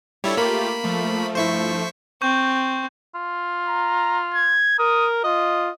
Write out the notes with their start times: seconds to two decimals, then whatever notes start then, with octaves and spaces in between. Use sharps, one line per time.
0.24 G3 D4 E4 F4 A4 C#5
0.37 A3 A#3 F4 G4 A#4 B5
0.84 F3 A3
1.35 G2 E4 C5 C#6 B6
2.22 C4 C#6 G6
3.15 F4
3.68 A#5
4.34 G#6
4.79 A#4 D#6
5.24 F4 D#5